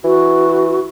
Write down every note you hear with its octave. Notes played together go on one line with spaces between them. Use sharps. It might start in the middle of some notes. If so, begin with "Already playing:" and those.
E3 F#4